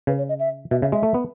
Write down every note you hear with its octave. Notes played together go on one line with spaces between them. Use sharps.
C#3 B4
C#5
D#5
E5
B2 E5
C#3 E5
G#3 E5
A3
B3